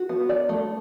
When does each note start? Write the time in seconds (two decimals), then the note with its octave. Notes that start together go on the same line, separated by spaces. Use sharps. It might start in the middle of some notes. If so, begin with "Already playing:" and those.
Already playing: F#4
0.09 B3
0.29 D5
0.49 A3